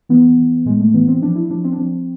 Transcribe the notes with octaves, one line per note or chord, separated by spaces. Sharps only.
E3 B3
E3
A2 G#3
A3
E3 B3
C4
F3 D4
E4
F3 D4
C4
D4
F3 C4